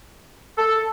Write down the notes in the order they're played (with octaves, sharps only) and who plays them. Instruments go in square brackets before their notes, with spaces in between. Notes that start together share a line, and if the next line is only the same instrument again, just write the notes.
[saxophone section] A4